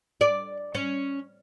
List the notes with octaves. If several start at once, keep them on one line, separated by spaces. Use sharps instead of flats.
D5
C#4